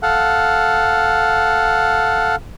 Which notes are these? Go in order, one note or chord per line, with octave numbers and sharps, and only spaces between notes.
A4 F5 F#5